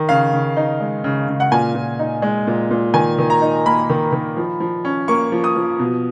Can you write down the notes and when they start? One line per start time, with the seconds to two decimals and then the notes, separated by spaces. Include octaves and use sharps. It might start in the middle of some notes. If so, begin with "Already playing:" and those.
Already playing: D#3
0.09 C#3 F5
0.33 C#3
0.57 D#4
0.80 G#3
1.04 C#3
1.28 C#3
1.40 F#5
1.52 A#2 G#5
1.75 A#2
1.99 D#4
2.22 G#3
2.47 A#2
2.71 A#2
2.94 D#3 G#5
3.19 D#3
3.30 A#5
3.42 D#4
3.66 A#3 B5
3.90 D#3
4.12 D#3
4.37 F3
4.60 F3
4.85 C#4
5.08 A#3 C#6
5.32 F3
5.44 D#6
5.56 F3
5.79 B2